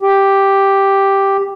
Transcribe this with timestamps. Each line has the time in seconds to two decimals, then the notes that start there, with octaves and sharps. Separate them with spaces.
0.02 G4